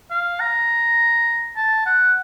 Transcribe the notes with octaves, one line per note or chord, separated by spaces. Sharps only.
F5
A#5
A5
F#5